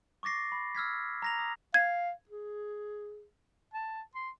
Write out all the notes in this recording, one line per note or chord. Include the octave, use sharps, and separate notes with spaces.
C#6 D6 A6 A#6 C7
B5
E6 F6 G#6 B6
A#5 A#6 F7
D#6
F5 G#6
G#4
A5
C6